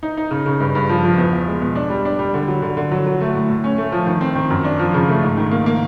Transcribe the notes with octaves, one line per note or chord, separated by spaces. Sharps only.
D#4
D#4
C#3
C#3
G2
G2
F3
F3
E2
E2
G#3
B2
D4
G3
D4
G3
D3
F#3
D3
D3
F#3
F#3
A3
A2
A2
C#4
A3
F3
D#3
C4
D#3
F#2
D4
F3
C#3
A3
G#2
D#3
A#3
A#3